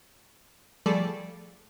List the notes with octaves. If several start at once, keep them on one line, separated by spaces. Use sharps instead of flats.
F3 G3 A3 G#4 A4 D5